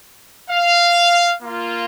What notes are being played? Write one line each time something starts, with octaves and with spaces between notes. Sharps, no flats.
F5
A#3 F4